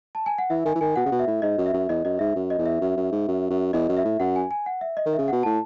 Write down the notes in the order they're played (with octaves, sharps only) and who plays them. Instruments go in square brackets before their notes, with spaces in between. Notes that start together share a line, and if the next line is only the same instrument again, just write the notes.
[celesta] A5
G#5
F#5
[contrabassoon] E3 [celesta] E5
[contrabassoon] D#3 [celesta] G#5
[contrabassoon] E3
[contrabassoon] D#3 [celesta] G#5
[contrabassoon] B2 [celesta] F#5
[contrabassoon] C#3
B2
[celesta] E5
[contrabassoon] A2
[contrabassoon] G#2 [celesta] D#5
[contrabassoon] F#2
[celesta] E5
[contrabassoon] F#2
[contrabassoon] E2 [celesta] D#5
[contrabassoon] F#2 [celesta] D#5
[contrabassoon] G#2 [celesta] E5
[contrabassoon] F#2
[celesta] D#5
[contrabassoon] E2
[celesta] E5
[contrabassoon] F#2
F#2
G#2
F#2
F#2
[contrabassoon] E2 [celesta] D#5
[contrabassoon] F#2
[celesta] E5
[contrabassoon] A2
[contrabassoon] F#2 [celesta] F#5
[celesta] G#5
G#5
F#5
E5
D#5
[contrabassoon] D#3
[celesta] E5
[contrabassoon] C#3
[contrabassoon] B2 [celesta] F#5
[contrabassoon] A2 [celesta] A5